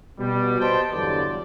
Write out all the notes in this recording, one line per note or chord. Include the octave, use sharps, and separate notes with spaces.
B2 G3
G4 B4 C5 D#5 G5 A5
E2 G2 D3 F#3 D5